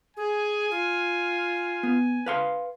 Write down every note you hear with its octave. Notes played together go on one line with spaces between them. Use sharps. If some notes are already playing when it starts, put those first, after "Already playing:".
G#4 G#5
F4
B3
B4 F5 C6